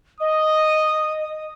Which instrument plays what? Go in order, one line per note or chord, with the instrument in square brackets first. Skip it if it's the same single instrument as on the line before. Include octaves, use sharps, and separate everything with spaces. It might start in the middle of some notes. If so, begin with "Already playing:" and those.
[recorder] D#5 [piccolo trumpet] D#6